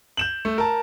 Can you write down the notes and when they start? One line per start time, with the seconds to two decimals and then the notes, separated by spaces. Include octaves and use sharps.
0.17 G6 E7 F#7
0.45 A3
0.58 A#4 A5